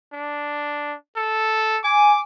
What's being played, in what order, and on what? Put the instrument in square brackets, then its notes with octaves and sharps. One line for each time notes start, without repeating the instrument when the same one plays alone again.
[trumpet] D4
A4
[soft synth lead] G#5 [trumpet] D6